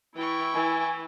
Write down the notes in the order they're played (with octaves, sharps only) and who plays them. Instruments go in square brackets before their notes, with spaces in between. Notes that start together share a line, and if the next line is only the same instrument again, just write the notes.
[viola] E3 [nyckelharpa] E4 [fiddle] G5 C#6
[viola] E3 [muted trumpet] G#5